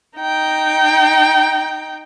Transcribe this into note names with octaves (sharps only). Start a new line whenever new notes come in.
D#4 G5